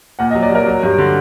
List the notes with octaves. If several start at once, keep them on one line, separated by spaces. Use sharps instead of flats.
A#2 F#5
D#5
F#3
D5
F#3 A#4
F#3
G2
D3